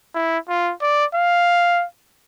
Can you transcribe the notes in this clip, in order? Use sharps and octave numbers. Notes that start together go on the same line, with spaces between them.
E4
F4
D5
F5